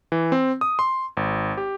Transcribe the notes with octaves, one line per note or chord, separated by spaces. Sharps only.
E3
C4
D#6
C6
G#1
G4